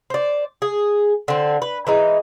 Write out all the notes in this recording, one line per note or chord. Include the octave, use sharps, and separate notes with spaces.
C5 D5
G#4
D3 C4
B4
E3 G#3 D#4